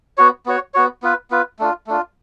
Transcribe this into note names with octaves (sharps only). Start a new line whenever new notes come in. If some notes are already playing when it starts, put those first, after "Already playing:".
B3 F#4 C#5
B3 F#4 C#5
B3 F#4 C#5
B3 F4 B4
B3 F4 B4
A3 D4 F4
A3 D4 F4